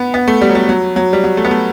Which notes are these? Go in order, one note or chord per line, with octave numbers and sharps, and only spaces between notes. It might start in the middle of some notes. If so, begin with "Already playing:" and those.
Already playing: B3
B3
A3
G3
F#3
G3
F#3
F#3
G3
F#3
A3
B3
A3